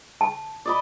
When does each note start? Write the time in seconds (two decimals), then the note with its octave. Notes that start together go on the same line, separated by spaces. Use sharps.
0.21 A5
0.65 D5 D#5 B5